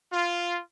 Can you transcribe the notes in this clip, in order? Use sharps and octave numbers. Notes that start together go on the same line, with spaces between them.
F4